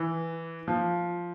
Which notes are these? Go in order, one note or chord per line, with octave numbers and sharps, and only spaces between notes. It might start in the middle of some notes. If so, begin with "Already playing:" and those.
Already playing: E3
F3